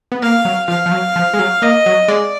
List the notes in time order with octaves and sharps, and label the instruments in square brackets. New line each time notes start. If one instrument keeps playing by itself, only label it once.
[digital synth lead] B3
[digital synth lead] A#3 [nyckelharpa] F5
[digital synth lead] F#3
[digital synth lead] F3 [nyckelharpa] F5
[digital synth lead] F3
F#3
F3
G#3
F#3
[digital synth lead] A#3 [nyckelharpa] D#5
[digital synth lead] F#3
[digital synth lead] G#3 [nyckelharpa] D5